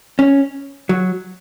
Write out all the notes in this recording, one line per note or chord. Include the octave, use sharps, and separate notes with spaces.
C#4
F#3